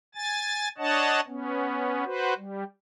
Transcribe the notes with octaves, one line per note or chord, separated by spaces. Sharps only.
G#5 A6
D4 C#5 D#5 F#5 A5
B3 C#4
F#4 B4 C5
G3